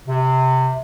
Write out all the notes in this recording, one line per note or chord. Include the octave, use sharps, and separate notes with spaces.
C3